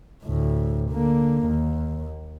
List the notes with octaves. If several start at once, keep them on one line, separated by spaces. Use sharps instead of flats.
D2 A2
D3 A#3
D#2